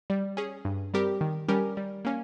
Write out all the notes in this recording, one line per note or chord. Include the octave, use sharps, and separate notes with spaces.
G3
C#4 G#4
G2
G3 C4 G4 A#4
D#3
G3 C#4 G4 A#4
G3
A#3 C#4